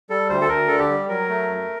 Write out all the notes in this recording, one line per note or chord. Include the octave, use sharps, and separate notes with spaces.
G3 A4
D2 C5
A4
D2 A#4
D3 A4
G4
G3
F#3 A#4
A3
F#2